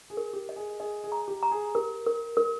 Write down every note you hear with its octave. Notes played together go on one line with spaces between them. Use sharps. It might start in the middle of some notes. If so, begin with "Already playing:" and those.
G#4
A#4
G4
D#5
G#4
G#4 D#5
G#4
A#5
G4
A#5
G#4
G4 A#4
A#4
A#4